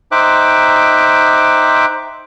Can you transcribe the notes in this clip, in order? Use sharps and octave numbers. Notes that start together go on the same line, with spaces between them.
D#4 C5 E5 G5 D6 F#6